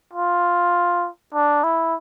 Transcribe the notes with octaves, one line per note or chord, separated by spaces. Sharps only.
F4
D4
E4